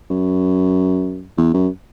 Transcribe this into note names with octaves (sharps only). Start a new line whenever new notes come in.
F#2
E2
F#2